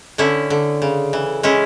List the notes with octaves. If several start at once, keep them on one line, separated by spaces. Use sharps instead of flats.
D3 C#4 E4
D3
C#3
E3
G#3 C#4 E4